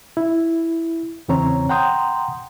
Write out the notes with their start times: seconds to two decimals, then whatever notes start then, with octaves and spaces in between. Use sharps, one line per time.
0.17 E4
1.28 E2 C#3 E3 C4 C#5 A#5
1.69 F#5 G5 A#5 C6 D#6 G6